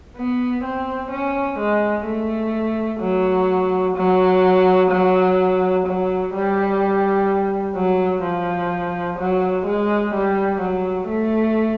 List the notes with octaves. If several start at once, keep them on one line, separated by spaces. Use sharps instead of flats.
B3
C4
C#4
G#3
A3
F#3
F#3
F#3
F#3
G3
F#3
F3
F#3
G#3
G3
F#3
A3